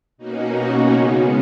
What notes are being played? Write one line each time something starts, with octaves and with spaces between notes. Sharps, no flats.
B2 A#3 C#4 D#4 F#4
C#3 G#3 B3